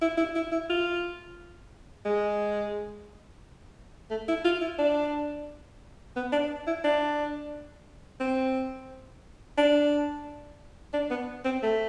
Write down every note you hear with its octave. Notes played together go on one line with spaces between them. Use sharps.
E4
E4
E4
E4
F4
G#3
A3
E4
F4
E4
D4
B3
D4
E4
D4
C4
D4
D4
B3
C4
A3